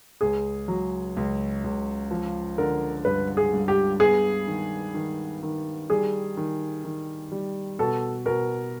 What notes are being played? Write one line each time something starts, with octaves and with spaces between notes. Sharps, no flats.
C#2 G#4
F#3
C#2
C#2
F3
D3 A#4
G2 B4
G#4
G2
G4
B3 G#4
D#3
D#3
D#3
G3 G#4
D#3
D#3
G3
B2 A4
B2 A#4